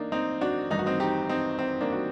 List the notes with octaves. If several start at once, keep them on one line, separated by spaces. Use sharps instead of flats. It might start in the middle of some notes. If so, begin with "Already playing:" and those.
Already playing: A1 A#3 D4 D#4
C4 D#4
D4 F#4
A1 G2 D#3 D#4
F#4
C4 D#4
D#4 G4
C4 D#4
C4
A#3 D4
F#4